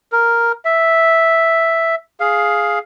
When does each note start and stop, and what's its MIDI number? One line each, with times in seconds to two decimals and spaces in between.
0.12 0.52 70
0.65 1.95 76
2.20 2.79 68
2.20 2.79 77